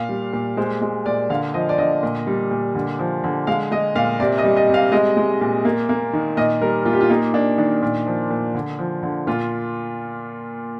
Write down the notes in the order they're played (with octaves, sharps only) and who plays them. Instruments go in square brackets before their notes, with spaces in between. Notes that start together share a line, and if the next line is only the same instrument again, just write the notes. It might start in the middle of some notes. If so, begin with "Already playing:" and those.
Already playing: [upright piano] A#2 F5
G3
A#2
G#3 C5
G#3
A#2 D5
D3 F5
F3 D#5
D5
D3 D#5
A#2
G3
A#2
D3
F3
D3
G#3 F5
G#3 D#5
A#2 F5
C3 D5
D#5
G3
D#5
C3
F5
G#3 D#5
G#3
A#2
A#3
A#3
D#3
A#2 D#5
G3 A#4
A#2 F4
G4
F4
A#3 D#4
A#3 D4
D#3 D4
A#2
F3
A#2
D3
F3
D3
A#2 F4